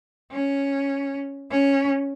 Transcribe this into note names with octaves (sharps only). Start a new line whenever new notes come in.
C#4
C#4